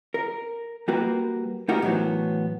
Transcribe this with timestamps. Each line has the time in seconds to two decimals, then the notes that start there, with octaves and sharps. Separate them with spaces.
0.14 A#4
0.88 G3 A#3 F#4 A#4 B4
1.68 A3 B3 D#4 F#4 G4 A#4
1.82 A2 E3 F#3 B3 C5